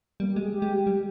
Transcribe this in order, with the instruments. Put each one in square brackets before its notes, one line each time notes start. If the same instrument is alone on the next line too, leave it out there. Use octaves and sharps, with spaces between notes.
[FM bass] G3 [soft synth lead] A#3
[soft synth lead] G4
[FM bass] G#3
[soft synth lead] G#4
G4
[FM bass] G#3
G3